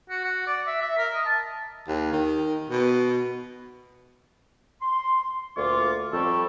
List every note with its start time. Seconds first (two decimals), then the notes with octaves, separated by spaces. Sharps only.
0.10 F#4
0.24 F#4
0.47 D5
0.67 E5
0.81 E5
0.98 A#4
1.14 D#5
1.26 A5
1.88 D#2
2.13 D#3
2.70 B2
4.82 C6
5.57 D2 A#2 F4 C#6 D6
6.13 F2 F3 G3 A4 C#6